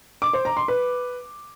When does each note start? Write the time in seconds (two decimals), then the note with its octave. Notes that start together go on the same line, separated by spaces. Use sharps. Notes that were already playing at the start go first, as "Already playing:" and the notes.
0.22 D6
0.33 C5
0.45 A#5
0.57 C6
0.68 B4